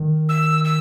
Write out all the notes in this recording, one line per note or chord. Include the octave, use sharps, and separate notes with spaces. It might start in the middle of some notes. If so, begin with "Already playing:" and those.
Already playing: D#3
E6
E6